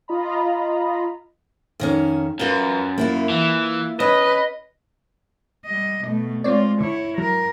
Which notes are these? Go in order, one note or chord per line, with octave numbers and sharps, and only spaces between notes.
F4 D#5 A#5 B5
F2 D#3 C#4
F#2 F4 B4
A#3 E4 F4
E3
C#4 B4 D#5
G3 D#5
B2 A3
G#3 C4 F4 C#5 D5
D3 E4 C#5
F#3 A#4